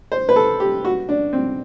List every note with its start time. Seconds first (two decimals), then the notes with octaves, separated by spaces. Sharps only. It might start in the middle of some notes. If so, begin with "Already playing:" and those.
0.12 C5
0.29 B4
0.36 A4
0.60 G4
0.85 F#4
1.09 D4
1.33 C4